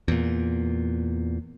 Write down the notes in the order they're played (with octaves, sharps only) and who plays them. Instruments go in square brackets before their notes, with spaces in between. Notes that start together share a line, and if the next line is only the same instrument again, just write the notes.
[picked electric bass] E2 A#2